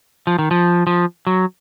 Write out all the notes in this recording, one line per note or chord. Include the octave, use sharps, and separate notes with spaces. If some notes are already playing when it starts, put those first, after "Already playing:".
F3
D#3
F3
F3
F#3